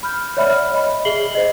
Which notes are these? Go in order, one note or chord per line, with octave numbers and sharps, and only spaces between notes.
B5 F6 G6
C#5 D5 E5 F#5 B5 F6
C#5 D#5 B5
G#4 E5 C7 F#7 G7
C5 D#5